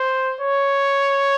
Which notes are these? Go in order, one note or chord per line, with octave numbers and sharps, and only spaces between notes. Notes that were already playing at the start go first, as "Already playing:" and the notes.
Already playing: C5
C#5